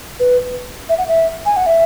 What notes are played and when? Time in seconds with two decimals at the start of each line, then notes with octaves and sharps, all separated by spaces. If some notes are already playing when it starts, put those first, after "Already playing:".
0.20 B4
0.89 E5
0.98 F#5
1.08 E5
1.46 G#5
1.57 F#5
1.66 E5